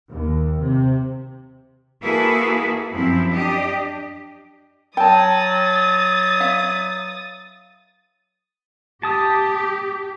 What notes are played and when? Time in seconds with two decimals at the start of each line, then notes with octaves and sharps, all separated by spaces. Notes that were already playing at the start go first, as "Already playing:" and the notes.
0.11 D#2
0.61 C3
2.01 A#3 E4 F#4 G#4 A4 B4
2.92 F#2 F3 C4 E4
3.30 D4 G4 D#5
4.97 F#3 G5 A5 D#6 A6
6.40 C#5 E5 F5
9.03 G4 A5 D#6